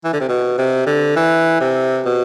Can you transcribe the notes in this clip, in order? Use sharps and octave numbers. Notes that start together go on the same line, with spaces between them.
E3
D3
C3
B2
C3
D3
E3
C3
B2